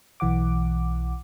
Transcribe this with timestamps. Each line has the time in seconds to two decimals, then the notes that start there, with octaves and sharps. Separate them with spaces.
0.20 B1 E3 F#5 D6